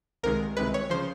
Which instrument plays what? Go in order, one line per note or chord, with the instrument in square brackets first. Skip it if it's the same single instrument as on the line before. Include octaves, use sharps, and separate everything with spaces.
[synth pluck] C2 C3 D#3 G#3 A#4
C2 C3 D#3 G#3 B4
C#5
C#3 F3 C5